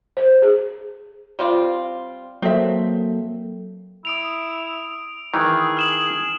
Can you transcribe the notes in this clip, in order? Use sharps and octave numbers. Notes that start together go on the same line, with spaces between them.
C5
G#4
G3 C4 F4
F#3 A#3 C4 A4 E5
E4 D#6 D7 F7
D#3 E3 G#4
F6 E7 F#7